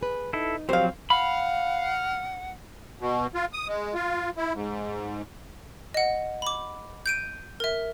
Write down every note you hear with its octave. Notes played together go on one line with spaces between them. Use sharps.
G#4 B4
D#4 E4 A4
B2 F3 F#3 C4 G4 C5 F5
F5 F#5 B5
B2
F4
D#6
G#3
F4
E4
G#2
D#5 F#5
B5 D6
G6 D7 D#7
A#4 E5